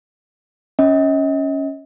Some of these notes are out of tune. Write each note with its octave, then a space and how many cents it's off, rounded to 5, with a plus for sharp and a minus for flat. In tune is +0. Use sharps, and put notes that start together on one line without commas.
C#4 +0 D#5 +40